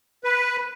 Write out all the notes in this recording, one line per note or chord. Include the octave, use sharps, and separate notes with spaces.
B4